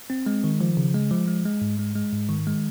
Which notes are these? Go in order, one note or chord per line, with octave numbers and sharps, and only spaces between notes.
C4
G#3
D#3
F3
C#3
G#3
F3
G#3
G#3
G#2
G#3
G#3
G#2
D#3
G#3